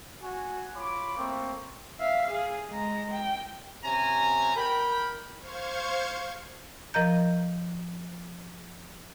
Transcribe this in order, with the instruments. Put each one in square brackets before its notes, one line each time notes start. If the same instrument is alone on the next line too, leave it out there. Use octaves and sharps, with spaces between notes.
[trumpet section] F#4 G#5
F4 C#5 B5 D6
A3 A#3 C4 A#4 C#6
[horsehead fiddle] E5 F5
G#4
G#3 A#5
G5
[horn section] C3 C#4 G#5 A#5
A#4 G5 B5
[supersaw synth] C5 F5 C#6 G#6
[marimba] F3 A#4 D#5 A#5 G6